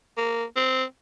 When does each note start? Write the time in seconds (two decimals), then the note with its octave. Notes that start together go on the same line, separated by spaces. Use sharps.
0.17 A#3
0.56 C4